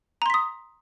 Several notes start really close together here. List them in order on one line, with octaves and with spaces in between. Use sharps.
A#5 C6 B6 D#6